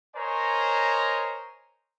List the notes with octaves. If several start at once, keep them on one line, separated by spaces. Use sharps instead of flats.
A#4 C5 C#5 D#5 G#5 A#5